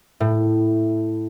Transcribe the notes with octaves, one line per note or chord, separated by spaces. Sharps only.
A2